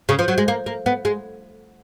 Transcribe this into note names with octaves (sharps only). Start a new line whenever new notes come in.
C#3
F3
F#3
G#3
A#3
A#3
B3
G#3